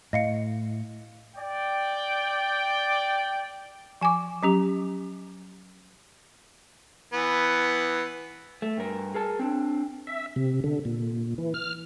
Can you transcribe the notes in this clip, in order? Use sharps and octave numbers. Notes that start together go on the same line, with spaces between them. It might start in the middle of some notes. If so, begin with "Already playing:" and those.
A2 D#5 F5 C#7
D5 G5
F3 G#5 C#6 D6
F#3 C#4 G4
E3 B3
A3
G2 A#4
G#4 A#4 A5
C4 D4
E5
C3
D3
A#2
E3
F6